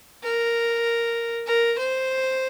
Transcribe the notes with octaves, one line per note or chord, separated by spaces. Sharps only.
A#4
A#4
C5